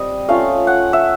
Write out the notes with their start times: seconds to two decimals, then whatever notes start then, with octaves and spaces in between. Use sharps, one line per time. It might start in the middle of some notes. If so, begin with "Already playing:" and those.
Already playing: G3 C4 D#5
0.29 A3 C#4 F4 F5
0.67 F#5
0.93 E5